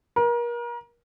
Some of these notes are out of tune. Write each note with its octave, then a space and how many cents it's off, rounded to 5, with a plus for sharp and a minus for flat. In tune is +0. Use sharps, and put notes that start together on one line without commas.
A#4 +35